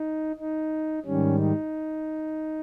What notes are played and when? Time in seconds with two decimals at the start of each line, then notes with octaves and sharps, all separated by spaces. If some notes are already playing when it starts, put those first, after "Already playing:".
Already playing: D#4
0.39 D#4
1.05 G#2 D#3 G3 C#4
1.39 D#4